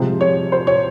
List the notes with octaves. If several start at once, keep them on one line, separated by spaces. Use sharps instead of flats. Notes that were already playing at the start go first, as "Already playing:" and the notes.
Already playing: C3 F3 G#3 C5
C#5
C5
C#5